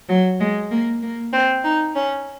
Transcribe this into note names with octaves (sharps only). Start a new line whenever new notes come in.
F#3
G#3
A#3
A#3
C4
D#4
C#4